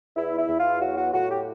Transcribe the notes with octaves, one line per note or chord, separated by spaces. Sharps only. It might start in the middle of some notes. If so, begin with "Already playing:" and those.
E2 E4
E4
E2
F4
F#3 F#4
F#4
A2 F#4
G4